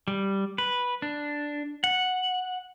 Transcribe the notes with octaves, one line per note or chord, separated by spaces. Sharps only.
G3
B4
D4
F#5